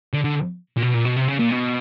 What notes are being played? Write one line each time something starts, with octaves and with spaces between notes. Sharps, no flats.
D3
D3
A#2
B2
A#2
B2
C3
C#3
A#2
B2